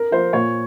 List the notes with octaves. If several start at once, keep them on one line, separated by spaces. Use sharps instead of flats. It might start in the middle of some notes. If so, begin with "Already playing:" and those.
Already playing: A#4
F3 C5
A#2 C#5